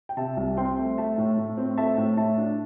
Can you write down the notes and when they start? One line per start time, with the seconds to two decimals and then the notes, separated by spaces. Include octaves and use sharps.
0.09 G5
0.17 C3 E5 A5
0.37 C2
0.57 C4 G5 C6
0.78 A3
0.98 A3 E5 A5
1.18 A2
1.37 A2
1.57 C4
1.77 A3 E5 A5
1.97 A2
2.17 A2 E5 A5
2.38 D4